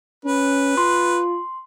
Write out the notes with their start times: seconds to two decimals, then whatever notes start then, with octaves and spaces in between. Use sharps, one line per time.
0.25 C#4 B4
0.77 F4 C6